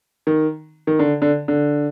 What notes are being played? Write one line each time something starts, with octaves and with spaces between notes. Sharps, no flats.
D#3
D#3
D3
D3
D3